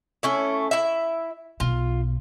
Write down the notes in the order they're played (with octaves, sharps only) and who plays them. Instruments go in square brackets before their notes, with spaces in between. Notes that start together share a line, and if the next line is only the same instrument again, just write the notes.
[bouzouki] A3 C#4 E4
E4 E5
[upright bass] B1 B2 [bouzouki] F4